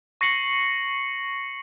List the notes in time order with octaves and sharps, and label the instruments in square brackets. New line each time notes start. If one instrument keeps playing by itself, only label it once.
[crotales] C#6 A#6 C7 C#7 F#7